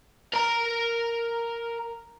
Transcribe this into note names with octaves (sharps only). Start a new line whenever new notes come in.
A#4 A#5